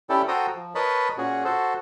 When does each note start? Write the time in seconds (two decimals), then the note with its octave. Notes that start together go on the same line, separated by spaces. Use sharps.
0.10 C#4 E4 G4 A4 D5 G5
0.28 F#4 A4 C5 G5 A#5 D#6
0.55 F3
0.75 A#4 B4 C#5 D#5 A5 B5
1.18 A#2 C#4 F#4 G#4
1.45 F#4 A4 C5